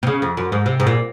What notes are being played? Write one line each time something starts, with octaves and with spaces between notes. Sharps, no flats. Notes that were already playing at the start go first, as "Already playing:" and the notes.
C3
C#3
F2
F#2
G#2
C3
G#2
A#2